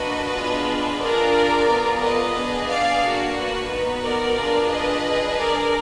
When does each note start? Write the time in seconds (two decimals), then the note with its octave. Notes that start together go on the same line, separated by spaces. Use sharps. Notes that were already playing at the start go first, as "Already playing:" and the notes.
Already playing: A#3 D4 F#4 B4 D#5
0.33 B3 D4 F4 G#4
1.00 D4 F4 G#4 A#4 D5
1.67 B3 F4 G#4
2.02 B4 D#5
2.35 B3 D4 G#4
2.69 D5 F5
3.02 A#3 D4 F#4
3.36 B4
3.70 B3 D#4 F#4
4.03 A#4 D5
4.38 D4 F4 G#4
4.70 B4 D#5
5.05 D4 G#4
5.39 A#4 D5